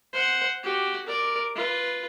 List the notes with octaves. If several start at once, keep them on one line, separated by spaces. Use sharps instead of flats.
C5 F#5
F#4 G4
A#4 D5
F4 B4